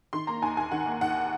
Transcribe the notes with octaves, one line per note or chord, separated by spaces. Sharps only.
D#3 C6
A#3 A#5
D#2 G#5
D#2 G#5
D#3 F#5
A#3
D#2 F#5